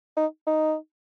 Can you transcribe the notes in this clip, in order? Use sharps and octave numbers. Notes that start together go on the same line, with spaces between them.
D#4
D#4